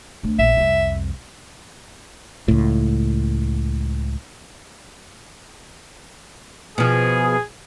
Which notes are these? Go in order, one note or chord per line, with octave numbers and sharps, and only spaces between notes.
D2
A#1 E5
C2 F2
C#2 A2
B2 F3 G#4